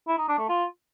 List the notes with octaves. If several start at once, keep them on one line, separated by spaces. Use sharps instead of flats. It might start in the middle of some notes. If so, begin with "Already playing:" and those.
E4
D#4
D4
A3
F4